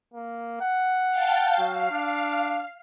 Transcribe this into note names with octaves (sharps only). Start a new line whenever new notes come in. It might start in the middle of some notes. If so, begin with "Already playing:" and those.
A#3
F#5
F5 G5 A5
F#3 F5
D4